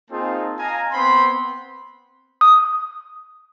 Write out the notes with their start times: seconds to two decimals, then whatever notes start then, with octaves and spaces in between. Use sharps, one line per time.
0.10 A#3 C4 D#4 F4 G#4 A5
0.59 D#5 F5 G#5 A#5
0.92 B3 C4 B5 C6
2.41 D#6